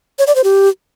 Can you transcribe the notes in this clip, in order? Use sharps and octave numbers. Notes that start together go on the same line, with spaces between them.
C#5
D5
C5
G4